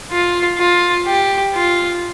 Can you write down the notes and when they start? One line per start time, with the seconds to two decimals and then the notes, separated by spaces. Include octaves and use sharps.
0.11 F4
0.58 F4
1.06 G4
1.54 F4